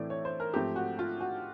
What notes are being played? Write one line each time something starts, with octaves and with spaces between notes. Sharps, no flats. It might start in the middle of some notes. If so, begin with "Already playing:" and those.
Already playing: A2 E3 A3 C4 D5
C#5
C5
A#4
G#2 F3 A3 C4 G4
F#4
F4
F#4